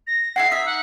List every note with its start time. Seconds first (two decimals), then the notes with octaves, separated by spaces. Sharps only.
0.07 A#6
0.36 E4 G#4 F#5 C7
0.51 D#4 E5 B6
0.66 F#5